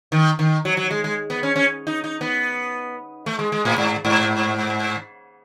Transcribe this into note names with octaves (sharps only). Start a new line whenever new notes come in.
D#3
D#3
F#3
F#3
G#3
G#3
B3
C#4
C#4
D#4
D#4
B3
A3
G#3
G#3
A2
G#2
G#2